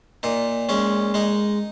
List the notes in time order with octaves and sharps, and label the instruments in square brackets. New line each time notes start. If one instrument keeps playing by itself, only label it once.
[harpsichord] A#2 D#4
G#3 C#4
G#3 D#4